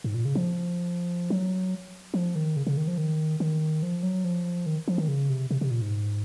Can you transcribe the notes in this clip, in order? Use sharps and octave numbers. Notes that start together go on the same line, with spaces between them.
G#2
A#2
C#3
F3
F#3
F3
D#3
C#3
C#3
D#3
F3
D#3
D#3
F3
F#3
F3
D#3
F3
D#3
C#3
C3
C3
C3
A#2
G#2